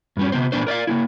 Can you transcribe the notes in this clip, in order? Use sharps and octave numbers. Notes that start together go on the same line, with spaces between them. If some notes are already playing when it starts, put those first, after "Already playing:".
G2 G3 C#4
C3 D#3 B3 C5
A#2 B3 D4 C5
A#4 D5 D#5 F5
A#3 B3 E4